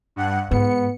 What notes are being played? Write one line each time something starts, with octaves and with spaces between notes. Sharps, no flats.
G2 F#5
G#2 B3 C#7